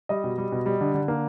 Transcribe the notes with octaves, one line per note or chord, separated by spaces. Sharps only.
G3 D#5
B2
G3
B2
G3
D3
D3
A#3